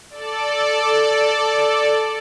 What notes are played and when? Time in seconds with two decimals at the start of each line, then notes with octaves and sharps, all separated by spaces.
0.10 A4 D5